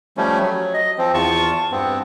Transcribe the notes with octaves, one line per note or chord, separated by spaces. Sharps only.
F3 G3 A3 C#4
F#3
D#5
F3 C4
E2 F4 A5 C#6
G2 B3 C4